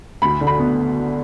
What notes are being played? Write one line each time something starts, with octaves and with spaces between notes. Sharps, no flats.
D2 B5
D3
B5
B3